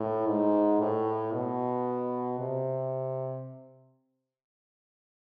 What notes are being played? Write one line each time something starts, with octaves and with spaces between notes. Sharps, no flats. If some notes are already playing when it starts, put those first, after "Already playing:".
Already playing: A2
G#2
A2
B2
C3